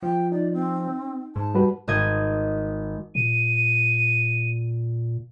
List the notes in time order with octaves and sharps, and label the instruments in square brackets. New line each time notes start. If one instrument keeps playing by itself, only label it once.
[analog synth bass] F3 [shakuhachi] G5
[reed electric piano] D#4 [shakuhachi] D5
[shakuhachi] C4
[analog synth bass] G#2 [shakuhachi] A5
[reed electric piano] G3 F#4 B4
[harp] G#1 D#5 G#6
[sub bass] A#2 [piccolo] D#7